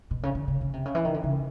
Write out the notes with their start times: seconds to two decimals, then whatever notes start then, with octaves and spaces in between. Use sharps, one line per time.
0.11 B2
0.23 C#3
0.35 D3
0.48 C#3
0.61 C#3
0.73 C3
0.86 C#3
0.95 E3
1.05 D#3
1.14 D3
1.24 C#3